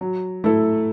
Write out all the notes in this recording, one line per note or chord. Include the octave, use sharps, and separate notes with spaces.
F#3
A3 E4 A4